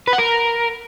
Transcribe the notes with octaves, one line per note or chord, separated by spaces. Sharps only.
B4
F#5
A#4